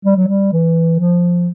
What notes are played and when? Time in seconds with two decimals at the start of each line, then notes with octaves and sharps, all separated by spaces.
0.05 G3
0.16 F#3
0.27 G3
0.52 E3
0.99 F3